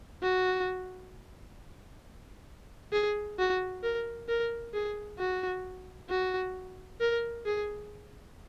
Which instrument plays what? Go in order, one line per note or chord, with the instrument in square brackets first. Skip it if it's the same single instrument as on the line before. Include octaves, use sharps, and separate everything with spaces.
[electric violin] F#4
G#4
F#4
A#4
A#4
G#4
F#4
F#4
A#4
G#4